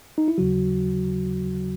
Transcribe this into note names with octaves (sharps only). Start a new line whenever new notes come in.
D#4
E4
D#2 C#3 F#3 F#4